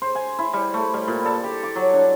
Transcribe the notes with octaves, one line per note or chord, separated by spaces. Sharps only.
C5
G#5
E4
G3
A3
G3
A#2
A4
G4
D6
F#3
D4